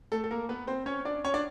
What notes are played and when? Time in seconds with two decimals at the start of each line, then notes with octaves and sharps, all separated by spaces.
0.12 A3 A4
0.24 A4
0.31 A#3 A#4
0.49 B3 B4
0.67 C4 C5
0.86 C#4 C#5
1.05 D4 D5
1.24 C#4 C#5
1.34 D4 D5